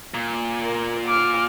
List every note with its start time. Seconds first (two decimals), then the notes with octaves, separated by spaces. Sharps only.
0.14 A#2
0.63 A#4
1.07 D6 F6